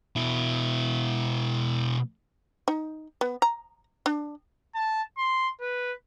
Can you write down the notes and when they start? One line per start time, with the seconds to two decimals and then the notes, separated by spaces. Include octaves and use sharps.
0.16 B2 E4
2.68 D#4
3.21 B3
3.42 A#5
4.06 D4
4.75 A5
5.18 C6
5.61 B4